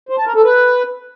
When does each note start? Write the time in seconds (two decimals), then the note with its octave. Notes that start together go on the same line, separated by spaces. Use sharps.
0.09 C5
0.18 A5
0.27 A#4
0.35 A4
0.44 B4